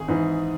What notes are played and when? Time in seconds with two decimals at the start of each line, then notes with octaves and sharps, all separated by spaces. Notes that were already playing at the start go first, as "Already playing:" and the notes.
Already playing: G#1 G#4
0.08 G#2 E3